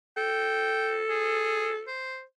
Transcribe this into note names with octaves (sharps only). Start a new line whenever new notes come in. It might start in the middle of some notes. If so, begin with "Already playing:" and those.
A4 G5
G#4
C5